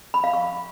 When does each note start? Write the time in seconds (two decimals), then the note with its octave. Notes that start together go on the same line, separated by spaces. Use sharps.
0.14 B5
0.24 F5
0.33 C#6